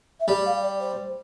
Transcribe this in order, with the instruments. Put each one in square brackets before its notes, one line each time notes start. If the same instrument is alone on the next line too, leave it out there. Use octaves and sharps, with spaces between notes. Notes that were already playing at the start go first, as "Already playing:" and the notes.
[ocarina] E5
[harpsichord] G3 [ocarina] D5
[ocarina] F5
D5
C5